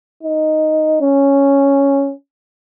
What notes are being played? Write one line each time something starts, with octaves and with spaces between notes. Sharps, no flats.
D#4
C#4